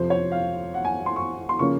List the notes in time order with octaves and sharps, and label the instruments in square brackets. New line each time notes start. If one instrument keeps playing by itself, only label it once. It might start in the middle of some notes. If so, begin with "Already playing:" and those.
Already playing: [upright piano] F2 C3 F3 C5
C#5
F5
F#5
G#5
C6
C#6
C6
C#3 F3 A#3 C#4 C#6